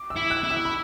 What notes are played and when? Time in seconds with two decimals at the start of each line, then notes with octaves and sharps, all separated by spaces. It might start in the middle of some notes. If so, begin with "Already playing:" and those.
Already playing: D6
0.10 E6
0.16 E4
0.30 F#6
0.44 E4
0.50 E6
0.65 B5